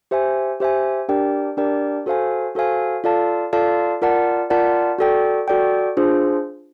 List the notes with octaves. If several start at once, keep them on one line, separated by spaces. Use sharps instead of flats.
G4 C5 E5 G#5
G4 C5 E5 G#5
D4 G4 A#4 D5 G5
D4 G4 A#4 D5 G5
F#4 A4 C5 F5 G#5
F#4 A4 C5 F5 G#5
F4 A4 D5 F5 A5
F4 A4 D5 F5 A5
F4 A#4 D5 F#5 A5
F4 A#4 D5 F#5 A5
F#4 A4 D5 G5
F#4 A4 D5 G5
D4 F4 G#4 C5